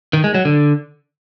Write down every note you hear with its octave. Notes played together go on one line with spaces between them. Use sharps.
D#3
G#3
F#3
D3